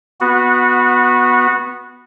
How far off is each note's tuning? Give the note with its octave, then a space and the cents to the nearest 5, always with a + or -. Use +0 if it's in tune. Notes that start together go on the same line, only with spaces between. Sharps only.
B3 -5 F#4 -20